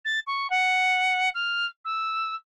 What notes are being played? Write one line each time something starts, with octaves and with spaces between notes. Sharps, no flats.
A6
C#6
F#5
F6
E6